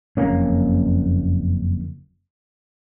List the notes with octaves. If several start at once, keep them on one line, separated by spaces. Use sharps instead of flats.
F#1 F2 A#3 C#4